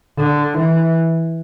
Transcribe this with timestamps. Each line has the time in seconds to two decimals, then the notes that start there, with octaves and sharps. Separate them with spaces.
0.18 D3
0.57 E3